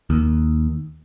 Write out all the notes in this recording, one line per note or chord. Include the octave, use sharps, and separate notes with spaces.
D#2